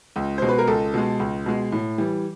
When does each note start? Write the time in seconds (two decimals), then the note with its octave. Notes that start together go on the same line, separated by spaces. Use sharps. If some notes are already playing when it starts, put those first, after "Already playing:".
0.16 C#2
0.38 B2 G#3 C5
0.49 B4
0.59 A#4
0.67 C#2 A4
0.94 B2 G#3
1.20 C#2
1.46 B2 G#3
1.72 A2
1.98 E3 G3